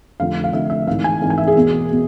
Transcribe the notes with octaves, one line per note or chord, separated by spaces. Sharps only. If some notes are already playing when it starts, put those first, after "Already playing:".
F1 F2 D3 F3 F5
F5
F1 F2 D3 F3 E5
E5
G#1 G#2 E3 F5
G#5
G#1 G#2 E3
G#5
E5
G#4
E1 E2 B2
B2